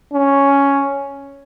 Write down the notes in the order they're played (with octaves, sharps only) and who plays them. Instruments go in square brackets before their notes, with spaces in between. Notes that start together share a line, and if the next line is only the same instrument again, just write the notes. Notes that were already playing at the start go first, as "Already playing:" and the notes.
[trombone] C#4